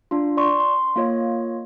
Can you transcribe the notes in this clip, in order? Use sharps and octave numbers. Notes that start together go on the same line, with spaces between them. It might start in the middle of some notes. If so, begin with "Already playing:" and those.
D4 F4
D5 C6 C#6
C6
A#3 F4 C#5 D#5